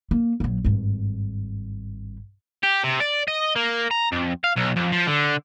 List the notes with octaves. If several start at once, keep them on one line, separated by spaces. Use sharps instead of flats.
A#3
A#1 F#3
G#1 G2
G4
C3
D5
D#5
A#3
A#5
F2
F5
B1
F2
F3
D3